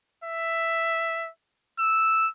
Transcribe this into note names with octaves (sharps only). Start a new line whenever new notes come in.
E5
E6